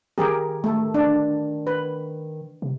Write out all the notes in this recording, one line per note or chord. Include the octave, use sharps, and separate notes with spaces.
D#3 G4 G#4 A#4
A3 A4
D4
B4
C3